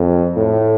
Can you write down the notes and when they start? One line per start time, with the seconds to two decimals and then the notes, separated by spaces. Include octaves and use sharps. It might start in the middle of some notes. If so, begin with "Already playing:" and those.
Already playing: F2
0.37 A2